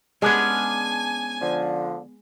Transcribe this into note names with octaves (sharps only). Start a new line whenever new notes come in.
G#3 B3 C#4 D4 G#5
D3 F3